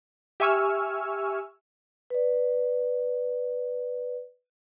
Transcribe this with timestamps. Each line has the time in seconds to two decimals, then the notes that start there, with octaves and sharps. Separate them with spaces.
0.40 G4 E5 G#5 C#6 E6 F6
2.10 B4 D5